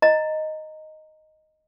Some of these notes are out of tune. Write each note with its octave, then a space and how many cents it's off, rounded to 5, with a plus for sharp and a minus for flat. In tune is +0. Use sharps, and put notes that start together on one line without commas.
D#5 +0 A#5 -15